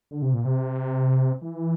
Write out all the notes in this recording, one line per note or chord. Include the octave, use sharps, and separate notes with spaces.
D3
C3
A#2
C3
E3